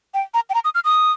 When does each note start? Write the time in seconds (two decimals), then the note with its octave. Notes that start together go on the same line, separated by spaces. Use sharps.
0.14 G5
0.34 A#5
0.50 G5
0.54 A#5
0.64 D#6
0.75 F6
0.84 D#6